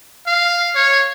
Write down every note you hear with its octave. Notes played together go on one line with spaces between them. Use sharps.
F5
C#5